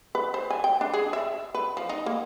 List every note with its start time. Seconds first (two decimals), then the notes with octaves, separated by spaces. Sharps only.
0.15 B4
0.34 C5
0.50 G#5
0.64 G5
0.81 D4
0.93 G#4
1.13 E5
1.55 B4
1.77 F3
1.89 D#4
2.06 A#3